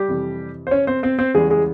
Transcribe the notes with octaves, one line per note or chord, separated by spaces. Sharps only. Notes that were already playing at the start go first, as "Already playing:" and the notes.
Already playing: G3 G4
F2 C3 E3
C5
C#4 C#5
C4 C5
C4 C5
C4 C5
E2 C#3 E3 G3 G#3 G#4
G#3 G#4